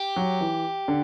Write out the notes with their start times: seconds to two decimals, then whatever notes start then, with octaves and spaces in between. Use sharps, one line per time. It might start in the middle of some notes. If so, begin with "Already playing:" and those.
Already playing: G4
0.16 F#3
0.41 E3
0.88 D3